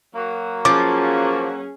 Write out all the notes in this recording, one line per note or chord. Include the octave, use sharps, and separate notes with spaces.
F#3 A#3
F3 C#4 G#4 D6